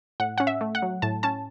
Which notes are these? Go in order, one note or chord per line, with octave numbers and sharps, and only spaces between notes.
A2 F#5
C#4 F#5
E5
A3
F#5
F#3
A2 A5
C#4 A5